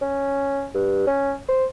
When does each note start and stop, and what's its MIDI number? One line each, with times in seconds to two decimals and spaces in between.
0.01 0.68 61
0.74 1.04 43
1.07 1.35 61
1.48 1.65 72